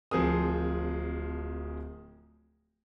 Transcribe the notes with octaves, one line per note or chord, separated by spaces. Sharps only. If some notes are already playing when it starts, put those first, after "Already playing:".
D1 F3 C4 G#4 A#4 D#6